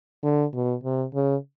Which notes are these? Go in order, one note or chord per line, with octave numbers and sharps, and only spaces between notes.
D3
B2
C3
C#3